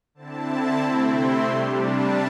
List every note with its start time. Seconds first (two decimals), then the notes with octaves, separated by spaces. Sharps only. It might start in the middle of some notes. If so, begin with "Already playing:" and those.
0.14 D3 C4 E4 A5
0.79 C3 A3 C4 E4 G5
1.11 C6
1.43 C3 G3 D4 C6
1.75 A5